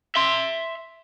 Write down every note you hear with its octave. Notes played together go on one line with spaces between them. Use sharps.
E5 C6